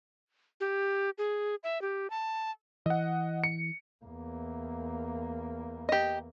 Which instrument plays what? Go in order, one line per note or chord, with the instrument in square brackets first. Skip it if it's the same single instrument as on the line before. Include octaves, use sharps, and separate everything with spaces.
[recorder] G4
G#4
E5
G4
A5
[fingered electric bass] E3 [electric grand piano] D#5 F#5
[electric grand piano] C#7
[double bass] E2 A#3
[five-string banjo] G4 D#5